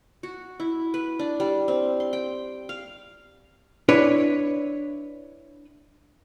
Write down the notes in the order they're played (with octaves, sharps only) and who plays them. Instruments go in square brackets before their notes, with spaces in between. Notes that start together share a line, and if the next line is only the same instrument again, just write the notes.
[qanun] F#4
E4
B4
D4
G3
C4
C6
G5
F5
[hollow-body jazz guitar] D4 E4 B4 C#5